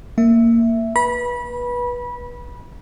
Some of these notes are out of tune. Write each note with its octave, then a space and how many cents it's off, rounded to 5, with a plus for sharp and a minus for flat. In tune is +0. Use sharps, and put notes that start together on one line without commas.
A#3 -15 E5 +0
B4 -20 B5 -25